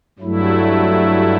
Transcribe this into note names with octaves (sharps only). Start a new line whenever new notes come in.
G2 F#3 A3 E4